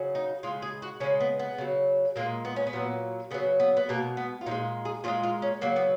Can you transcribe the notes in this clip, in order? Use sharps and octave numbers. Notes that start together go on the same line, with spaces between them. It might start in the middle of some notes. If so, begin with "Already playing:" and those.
Already playing: C#3 F#3
D#4
C#3 G#3 F4
G#4
F#4
C#3 G#3 C#4
B3
B3
C#3 F#3
A#2 G#3 A#3
B3
C#4
B3
A#2 F#3
C#3 F#3 B3
B3
B3
B2 G#3 A#3
B3
F4
A#2 F3 G#3 D#4
G#4
A#2 F3 G#3 F4
F4
C#4
C#3 F#3 A#3
B3